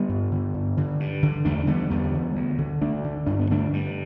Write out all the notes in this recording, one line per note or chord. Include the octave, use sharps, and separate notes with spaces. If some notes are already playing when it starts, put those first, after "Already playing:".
Already playing: D3 G3 B3
G2
D3
G2
D3
G2
D3
E2 A3 D4
D3 G3 B3
E2 G3 B3
D3
D2
D3
D2 A3 D4
D3
G2 D4
B3
D3 A3 D4
G2